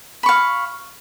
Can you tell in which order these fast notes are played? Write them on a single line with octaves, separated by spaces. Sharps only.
B5 C#6 F5